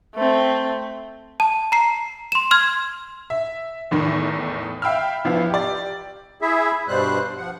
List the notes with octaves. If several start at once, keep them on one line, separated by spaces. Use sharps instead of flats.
A3 C4
A5
A#5 C7
C6 E7
C6 F6 G#6
E5
E2 A2 D#3
E5 F5 G5 B5 E6 F6
E2 F3 B3 E4 F5
G4 D5
E4 G#4 E5
G2 B2 G3 C5 F#6
F3 F#5